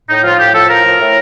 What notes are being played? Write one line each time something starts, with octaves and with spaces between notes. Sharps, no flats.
A2 D#4
F3 F4
A2 G4
F3 A4
A2 A#4
F3
A2